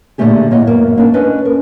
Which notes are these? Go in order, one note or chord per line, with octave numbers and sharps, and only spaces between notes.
A#2 D3 E3 A3 G4 G#4
A2 A#3 C#5 D#5 F#5
F#2 A#3 B3
A#3 C#4 D4 A#4
C#4 D4 B4 D#5
A#4